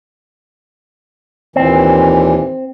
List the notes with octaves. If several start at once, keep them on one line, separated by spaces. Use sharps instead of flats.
D#2 A#2 E3 C4